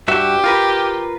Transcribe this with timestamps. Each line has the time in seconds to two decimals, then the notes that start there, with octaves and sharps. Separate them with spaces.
0.08 G2 F#4 G4 E5
0.44 F4 A#4 B4